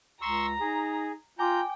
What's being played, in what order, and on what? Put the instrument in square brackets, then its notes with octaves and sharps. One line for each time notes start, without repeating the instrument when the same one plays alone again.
[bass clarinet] C#2 [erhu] A#5 [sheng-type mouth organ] C6 C#6 E6
[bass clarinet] D#4 [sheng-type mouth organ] G#4
[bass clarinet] F4 [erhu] G5 [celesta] G#5 D6 [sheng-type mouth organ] A#5 G6